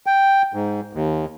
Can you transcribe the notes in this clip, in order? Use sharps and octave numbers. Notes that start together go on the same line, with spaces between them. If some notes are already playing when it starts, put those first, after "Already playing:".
G5
G#2
D#2